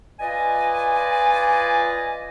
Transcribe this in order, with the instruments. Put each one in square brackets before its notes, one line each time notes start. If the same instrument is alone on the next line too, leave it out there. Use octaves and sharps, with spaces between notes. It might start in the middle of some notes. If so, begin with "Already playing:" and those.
[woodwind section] F4 B4 D5 D#5 G#5